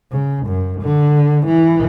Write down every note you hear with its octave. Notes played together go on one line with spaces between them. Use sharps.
C#3
F#2
D3
E3